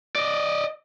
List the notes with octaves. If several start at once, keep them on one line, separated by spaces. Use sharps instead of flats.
D5 D#5